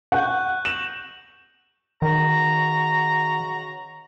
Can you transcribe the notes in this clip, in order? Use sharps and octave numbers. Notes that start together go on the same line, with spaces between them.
F#5 C#6 F#6 G6
A#6 E7 F#7
C#2 D#3 F#4 A#5